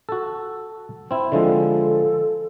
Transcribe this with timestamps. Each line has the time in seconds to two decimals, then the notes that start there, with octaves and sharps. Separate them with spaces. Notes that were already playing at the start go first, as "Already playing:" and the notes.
0.09 F#4 A4
1.11 C4 E4
1.32 D3 F3 G#3 A4